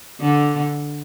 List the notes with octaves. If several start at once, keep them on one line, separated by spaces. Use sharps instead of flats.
D3